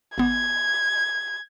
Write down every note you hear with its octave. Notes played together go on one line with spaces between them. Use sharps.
G#1 B3 G#6